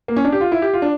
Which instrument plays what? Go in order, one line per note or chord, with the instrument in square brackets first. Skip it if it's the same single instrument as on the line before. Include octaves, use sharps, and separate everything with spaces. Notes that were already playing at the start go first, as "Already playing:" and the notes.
[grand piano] A#3
C#4
D4
G4
F4
E4
G4
F4
D4